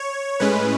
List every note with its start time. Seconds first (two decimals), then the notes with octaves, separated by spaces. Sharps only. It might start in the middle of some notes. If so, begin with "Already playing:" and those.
Already playing: C#5
0.40 A2 G#3 C#4 B4